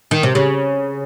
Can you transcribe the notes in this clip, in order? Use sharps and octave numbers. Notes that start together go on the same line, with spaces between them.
D#3
C3
C#3